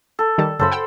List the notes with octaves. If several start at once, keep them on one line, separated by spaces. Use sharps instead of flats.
A4
D#3 G3 A5
F#2 C#3 A4 C5 B5
F#5 G5 E6